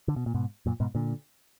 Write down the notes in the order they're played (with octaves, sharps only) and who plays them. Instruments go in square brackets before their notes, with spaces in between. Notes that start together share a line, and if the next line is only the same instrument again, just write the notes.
[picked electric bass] D3
B2
A#2
G#2 B2
F#2 A#2
G#2 B2
A#2 D3